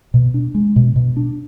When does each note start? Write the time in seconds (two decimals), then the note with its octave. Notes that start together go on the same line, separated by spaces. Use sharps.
0.14 B2
0.34 D4
0.55 G#3
0.76 B2
0.96 B2
1.16 D4